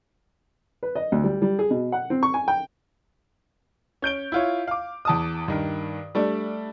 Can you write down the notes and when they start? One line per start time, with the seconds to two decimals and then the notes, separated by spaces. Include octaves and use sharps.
0.83 B4
0.95 D#5
1.12 D2
1.24 G3
1.42 G3
1.59 G#4
1.70 B2
1.92 F#5
2.10 C4
2.23 C#6
2.34 G#5
2.48 G5
4.02 C#4 G6 D7 G7
4.32 E4 F4 C#5
4.68 F5 D6
5.05 E2 A5 D#6
5.48 G2 D#3
6.15 G3 A3 D4